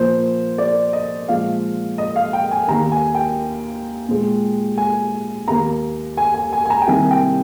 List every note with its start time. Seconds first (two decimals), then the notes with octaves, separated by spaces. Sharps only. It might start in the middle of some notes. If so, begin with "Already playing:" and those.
Already playing: A#2 F3 A#3 C5
0.58 D5
0.93 D#5
1.28 A#2 F3 G#3 F5
1.98 D#5
2.16 F5
2.33 G5
2.51 G#5
2.68 D#2 D#3 A#3 A#5
2.92 G#5
3.15 G5
4.08 A#2 G#3
4.78 G#5
5.48 D#2 D#3 A#3 A#5
6.17 G#5
6.34 G#5
6.53 G#5
6.65 G#5
6.70 A#5
6.81 G5
6.87 C2 C3 D#3 A#3 G#5
7.11 G5